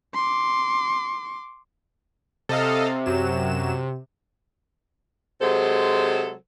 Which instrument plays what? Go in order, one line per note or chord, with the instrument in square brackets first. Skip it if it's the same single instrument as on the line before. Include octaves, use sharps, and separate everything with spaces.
[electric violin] C6 D6
[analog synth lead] C3 [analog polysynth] A4 D#5 F5
[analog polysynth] F#2 F#3 E7
[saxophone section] C3 F#3 G#3 A4 C5